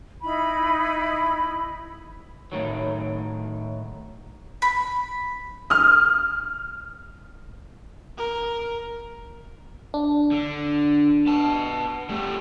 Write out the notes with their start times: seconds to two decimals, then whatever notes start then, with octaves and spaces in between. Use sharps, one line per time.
0.22 D#4 E4 B5
2.52 A2 D#3 F#3
4.62 B5
5.70 D#6 F6
8.18 A#4
9.94 D4
10.31 D3
11.27 B3 A5
12.09 G3 A3